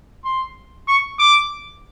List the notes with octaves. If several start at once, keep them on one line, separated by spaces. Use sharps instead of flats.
C6
C#6
D6